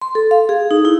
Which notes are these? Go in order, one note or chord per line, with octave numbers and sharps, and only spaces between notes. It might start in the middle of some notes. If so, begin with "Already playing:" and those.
C6
A4
F5
G#4
D#4
E4